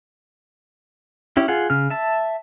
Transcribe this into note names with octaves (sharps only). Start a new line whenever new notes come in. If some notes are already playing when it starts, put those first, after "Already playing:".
C#4 E4 G4
F4 G#4 F#5
C#3 F6
E5 A5